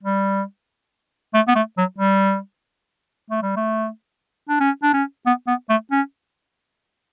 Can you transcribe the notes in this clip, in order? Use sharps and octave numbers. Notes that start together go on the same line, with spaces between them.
G3
A3
B3
A3
F#3
G3
A3
G3
A3
D4
C#4
D4
C#4
B3
B3
A3
C#4